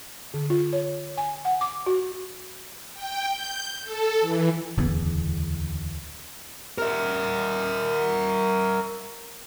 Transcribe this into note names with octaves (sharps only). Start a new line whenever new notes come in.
D3
F4
C#5
G#5
F#5
D6
F#4
G5
G6
A4
E3
D1 E2 C#3 B3
A#4 E5